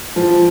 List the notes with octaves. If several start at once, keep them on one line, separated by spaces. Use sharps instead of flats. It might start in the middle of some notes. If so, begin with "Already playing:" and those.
F3